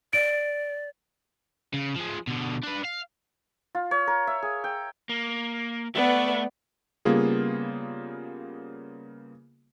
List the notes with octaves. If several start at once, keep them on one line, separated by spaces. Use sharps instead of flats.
D5 D7
C#3
F3 G#3
B2 D3
D4 B4
F5
F4
C#5
A#4
E5
G#4
G5
A#3
A3 B3 B4 D5
C#3 G3 A#3 B3 F4 G#4